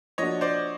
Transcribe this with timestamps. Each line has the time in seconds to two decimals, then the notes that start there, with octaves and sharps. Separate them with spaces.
0.18 F3 A#3 D4 F#4 C#5 D#5
0.41 C5 D5